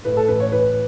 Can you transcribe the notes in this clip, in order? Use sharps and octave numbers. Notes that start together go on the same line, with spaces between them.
A2 B4
A4
A1 B4
C#5
A1 B4